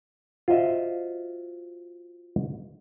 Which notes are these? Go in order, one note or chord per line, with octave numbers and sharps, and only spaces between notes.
F4 F#4 C5 D#5 E5